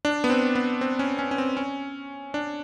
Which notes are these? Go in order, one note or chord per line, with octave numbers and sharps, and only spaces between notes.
D4
B3
C4
B3
C4
C#4
C#4
C#4
C4
C#4
D4